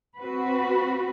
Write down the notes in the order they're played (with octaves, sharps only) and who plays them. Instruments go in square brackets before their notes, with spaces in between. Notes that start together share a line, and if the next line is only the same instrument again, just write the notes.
[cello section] C4 F#4 B4